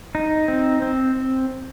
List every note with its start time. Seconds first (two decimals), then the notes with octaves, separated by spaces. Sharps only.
0.15 D#4
0.48 C4
0.82 C4